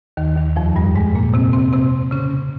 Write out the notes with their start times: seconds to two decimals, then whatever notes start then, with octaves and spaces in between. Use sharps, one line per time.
0.17 D#2 D#3
0.37 D#2 D#3
0.56 F2 F3
0.76 G2 G3
0.95 G#2 G#3
1.15 A#2 A#3
1.34 C3 C4
1.53 C3 C4
1.73 C3 C4
2.11 C#3 C#4